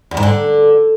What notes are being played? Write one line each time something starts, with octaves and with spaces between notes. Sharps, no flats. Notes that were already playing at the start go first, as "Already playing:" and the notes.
E2
G#2
D3